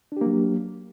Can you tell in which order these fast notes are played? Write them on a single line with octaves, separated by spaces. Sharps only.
D4 G4 A#3 F#3